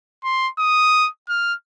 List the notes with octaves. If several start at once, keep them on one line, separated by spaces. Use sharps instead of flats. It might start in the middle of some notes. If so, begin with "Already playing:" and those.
C6
D#6
F6